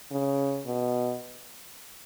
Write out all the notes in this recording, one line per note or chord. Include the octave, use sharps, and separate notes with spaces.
C#3
B2